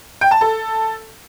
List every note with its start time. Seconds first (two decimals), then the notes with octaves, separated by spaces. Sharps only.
0.21 G5
0.31 A5
0.41 A4